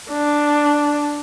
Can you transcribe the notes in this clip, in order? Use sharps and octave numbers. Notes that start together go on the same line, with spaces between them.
D4